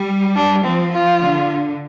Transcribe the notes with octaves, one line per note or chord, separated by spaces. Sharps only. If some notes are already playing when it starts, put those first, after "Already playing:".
Already playing: G3
D4
F3 C4
F4
D3